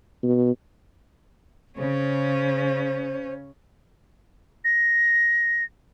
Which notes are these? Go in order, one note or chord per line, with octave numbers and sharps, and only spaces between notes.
B2
C#3 C#4 C5
A#6